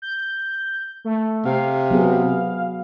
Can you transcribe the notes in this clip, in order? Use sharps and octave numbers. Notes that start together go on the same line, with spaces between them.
G6
A3
C3 F5
F#3 B3 G#4